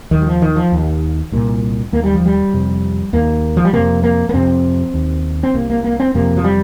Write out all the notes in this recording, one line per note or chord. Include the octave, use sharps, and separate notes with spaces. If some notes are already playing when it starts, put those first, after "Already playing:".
D#2 D#3
G3
F3
D#3
F3
D#2
C2 A#2
D#2 A#3
G3
F3
G3
F2 C3
D#2 A#3
F3
G3
F2 C3 A#3
A#3
A#3
F2 C3 C4
D#2
C4
C2 C3 A#3
A#3
A#3
C4
F2 C3 A#3
F3
G3